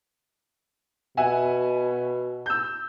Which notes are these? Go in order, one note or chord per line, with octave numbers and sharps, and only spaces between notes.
B2 E5 F#5 G#5
E6 G6